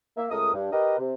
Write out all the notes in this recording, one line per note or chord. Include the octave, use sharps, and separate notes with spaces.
A#3 E5
C#2 A3 A#4 D#6
G2
G4 A#4 B4 D#5
C3